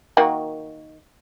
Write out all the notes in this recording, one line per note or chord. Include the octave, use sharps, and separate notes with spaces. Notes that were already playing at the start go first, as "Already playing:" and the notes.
D#3 A#3 F#4